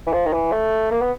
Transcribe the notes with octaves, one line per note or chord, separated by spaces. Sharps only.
E3
F3
D#3
E3
A3
A#3
B3